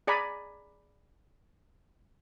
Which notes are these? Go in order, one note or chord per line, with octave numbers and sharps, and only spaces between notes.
G#4 D5 G#5 A#5 B5